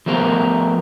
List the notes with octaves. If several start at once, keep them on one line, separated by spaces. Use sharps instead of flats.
F3 A3 B3 A#4 C5